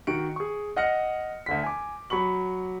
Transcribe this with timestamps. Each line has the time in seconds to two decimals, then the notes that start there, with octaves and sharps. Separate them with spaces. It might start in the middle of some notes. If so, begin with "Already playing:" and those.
0.07 D#3 F#4 C#7 D7
0.36 G#4 C#6
0.76 D#5 F#5 F6 A#6 C#7
1.46 D2 D3 B6
1.63 G#5 D6
2.10 F#3 B5 C#6 F#7